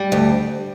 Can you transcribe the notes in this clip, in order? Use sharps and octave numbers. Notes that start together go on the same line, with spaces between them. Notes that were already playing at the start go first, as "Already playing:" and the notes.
Already playing: G3
D2